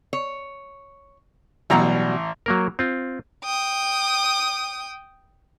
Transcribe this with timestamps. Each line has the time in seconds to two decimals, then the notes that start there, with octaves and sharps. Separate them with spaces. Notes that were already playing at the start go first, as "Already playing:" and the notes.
0.13 C#5
1.70 A1 B2 F#3 G3 A#5
2.46 F#3 A#3 A#4
2.79 C4 F4
3.44 G5 D#6